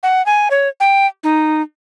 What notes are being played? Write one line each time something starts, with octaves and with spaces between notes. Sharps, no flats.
F#5
G#5
C#5
G5
D#4